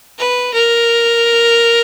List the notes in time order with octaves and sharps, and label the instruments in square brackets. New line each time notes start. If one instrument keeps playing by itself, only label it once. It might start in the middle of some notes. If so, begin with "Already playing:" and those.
[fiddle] B4
A#4